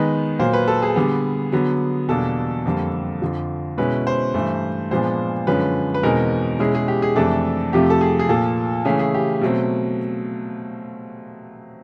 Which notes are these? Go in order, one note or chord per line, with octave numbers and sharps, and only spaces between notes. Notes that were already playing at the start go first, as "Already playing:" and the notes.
Already playing: D#3 G#3 B3 D#4 B4
A#2 F#3 A#3 C5
B4
A4
G#4
D3 G3 B3
D3 F#3 B3
E2 B2 G3 A#3 D4 A4
F2 D3 G3 A#3
F2 D3 F3
B2 G#3 C#4 E4 B4
C5
G2 E3 A3
A#2 F3 G#3 B3 D4 C5
F#2 D3 F3 G#3 C#4 B4
B4
E2 B2 G#3 C4 D#4 A#4
B2 G#3 C#4 E4 G#4
G#4
G4
G#4
F2 C3 E3 A3 D4 A4
F2 C3 F3 A3 G4
A4
G#4
G#4
A#2 F3 A#3 A4
C#3 E3 A3 C#4 E4 G#4
G#4
G4
B2 F#3 A3 C4